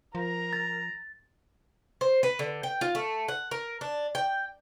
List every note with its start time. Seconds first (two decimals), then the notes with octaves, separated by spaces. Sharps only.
0.15 F3 A#4 A#5
0.53 A6
2.01 C5
2.23 B4
2.39 D3
2.63 G5
2.81 F4
2.95 A3
3.28 F#5
3.51 A#4
3.81 D4
4.15 G5